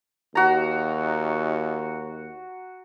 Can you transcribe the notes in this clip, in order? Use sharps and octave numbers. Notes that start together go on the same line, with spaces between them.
D#2 F#4 A#5